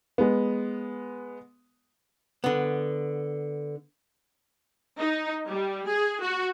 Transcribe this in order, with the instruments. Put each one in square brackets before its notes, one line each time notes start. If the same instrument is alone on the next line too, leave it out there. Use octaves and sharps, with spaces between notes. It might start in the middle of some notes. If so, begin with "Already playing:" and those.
[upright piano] G#3 B3
[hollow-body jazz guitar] D3 B3
[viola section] D#4
G3
G#4
F#4